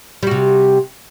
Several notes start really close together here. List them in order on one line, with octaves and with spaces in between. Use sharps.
G3 F#4 C3